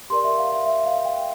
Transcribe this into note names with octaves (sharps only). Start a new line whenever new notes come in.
G4 A#4 D5 C6
E5
F5
E5
E5
F5
G5